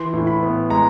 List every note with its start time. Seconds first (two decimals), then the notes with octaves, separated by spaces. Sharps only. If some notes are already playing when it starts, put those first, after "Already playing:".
Already playing: E3 C6
0.13 A2
0.27 B5
0.42 B3
0.70 G#3 A#5